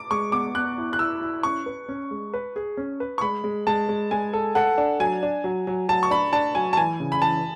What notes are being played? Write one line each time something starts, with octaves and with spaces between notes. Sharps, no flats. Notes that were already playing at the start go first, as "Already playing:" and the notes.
Already playing: D6
G#3 C#6
B3 D6
B3 F#6
E4
F#6
E4 E6
E4
C#4 C#6
B4
C#4
G#3
B4
G#4
C#4
B4
C#6
G#3 B5
G#3
G#3 A5
G#3
G#3 G#5
A4
A4 F#5
D4
F#3 G#5
D4
F#3
F#3
F#3 A5
C#6
D4 B5
D4 A5
F#3 G#5
A5
E3 G#5
C#3
B5
E3 A5